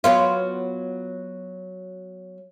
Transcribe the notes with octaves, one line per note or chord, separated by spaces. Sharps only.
F#3 B3 F4